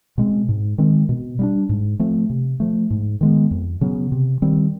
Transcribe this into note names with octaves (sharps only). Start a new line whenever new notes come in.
B2 G#3 C4
G#2
D#3 G#3 C4
B2
G3 B3 D4
G#2
F3 A3 C4
C3
F3 A3
G#2
D#3 G#3 B3
F2
C#3 F#3 B3
C3
D#3 G3 C4